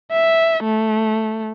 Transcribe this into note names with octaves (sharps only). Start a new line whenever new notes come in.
E5
A3